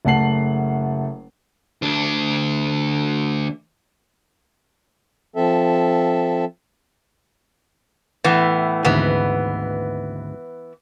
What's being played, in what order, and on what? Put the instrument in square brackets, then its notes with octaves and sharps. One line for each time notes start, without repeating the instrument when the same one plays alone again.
[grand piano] F#1 A3 F#5 A5 C7 F#7
[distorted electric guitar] D2 D4
[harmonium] F3 C4 A4 E5
[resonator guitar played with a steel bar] A2 E3 B3
[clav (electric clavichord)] G#1 D2 G#2 [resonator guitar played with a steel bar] E3 B3